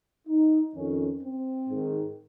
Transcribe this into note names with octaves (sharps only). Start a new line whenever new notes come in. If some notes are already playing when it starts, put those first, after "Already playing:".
D#4
F2 D#3 C#4
C4
G#2 D#3